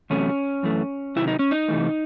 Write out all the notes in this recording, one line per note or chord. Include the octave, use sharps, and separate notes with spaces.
E2 C3 F#3 A3 C#4
F#2 E3 A3
C3 D#3 F#3 E4
D#4
C#4
D#4
C3 E3 A3